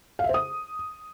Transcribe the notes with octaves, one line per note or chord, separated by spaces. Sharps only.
F5
E5
C5
D#6